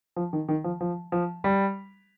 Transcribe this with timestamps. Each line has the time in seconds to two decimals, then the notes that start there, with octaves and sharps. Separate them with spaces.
0.16 F3
0.33 D#3
0.49 D#3
0.64 F3
0.81 F3
1.12 F3
1.44 G3